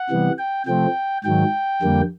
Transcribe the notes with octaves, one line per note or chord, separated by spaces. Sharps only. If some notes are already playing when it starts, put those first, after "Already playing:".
Already playing: F#5
C3 E3 G3 B3
G5
C3 F3 A3 C4 G5
G#2 D#3 F#3 G5
F2 D3 G3 A#3